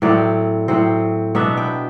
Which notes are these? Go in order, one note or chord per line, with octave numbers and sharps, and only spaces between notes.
A2 F#3 C4 D5
A2 F#3 C4
B2 F#3 B3 D4 E5
G5